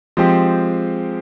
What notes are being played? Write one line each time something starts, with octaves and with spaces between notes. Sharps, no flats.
F3 G#3 C4 G4